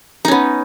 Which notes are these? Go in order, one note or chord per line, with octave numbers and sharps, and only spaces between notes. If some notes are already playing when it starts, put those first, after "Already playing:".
B3 C#4 D#4